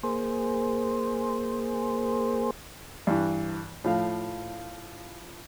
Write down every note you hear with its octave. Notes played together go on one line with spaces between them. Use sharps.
A#3 G#4 C5
G2 E3
A2 F3 F5